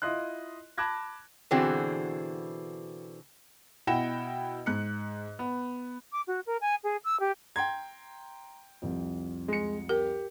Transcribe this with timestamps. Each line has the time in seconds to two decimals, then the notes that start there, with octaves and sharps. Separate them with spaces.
0.02 E4 F4 D#5 C6 F#6
0.78 A5 B5 D6 F#6 G#6 A#6
1.51 B2 D3 E3 C4 F#4 G#4
3.87 B2 E4 F#5 G5 A#6 E7
4.66 G#2 F#6 C#7
5.39 B3
6.12 D6
6.27 F#4
6.46 A#4
6.61 G#5
6.84 G#4
7.04 E6
7.20 G4
7.56 G5 A#5 C6 G#6
8.82 C2 F2
9.48 G#3 C#7
9.89 G4 A#4